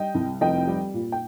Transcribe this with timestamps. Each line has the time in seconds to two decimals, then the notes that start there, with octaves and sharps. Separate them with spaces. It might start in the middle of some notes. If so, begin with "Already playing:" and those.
Already playing: G3 D#5 G5
0.15 C2
0.41 F1 D#5 G5
0.67 G3
0.94 A#2
1.12 G5